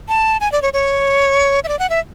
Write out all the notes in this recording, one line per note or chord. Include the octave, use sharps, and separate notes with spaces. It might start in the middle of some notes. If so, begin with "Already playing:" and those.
A5
G#5
D5
C#5
C#5
E5
D5
F#5
E5